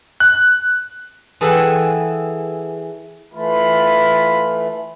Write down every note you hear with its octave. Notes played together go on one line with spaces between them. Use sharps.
F#6
E3 G#4 A4 E5 F#5 G5
E3 A3 F4 B5